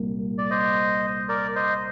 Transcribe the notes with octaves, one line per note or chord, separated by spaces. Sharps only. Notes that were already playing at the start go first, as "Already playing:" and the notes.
Already playing: C2 A#2 G3 A#3
D5
C5 D#5
A#4 D5
C5 D#5